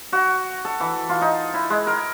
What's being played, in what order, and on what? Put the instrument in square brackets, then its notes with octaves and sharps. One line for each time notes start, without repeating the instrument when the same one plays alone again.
[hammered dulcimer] F#4
A4
E3
F4
D#4
E4
G#3
A#4